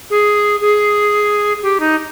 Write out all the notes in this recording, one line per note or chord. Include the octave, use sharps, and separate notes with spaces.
G#4
G#4
G4
D#4